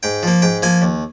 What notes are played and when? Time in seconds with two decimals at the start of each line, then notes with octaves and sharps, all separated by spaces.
0.03 G#2 G5
0.23 F3 A#3
0.42 G#2 G5
0.62 F3 A#3 G#5
0.82 D#2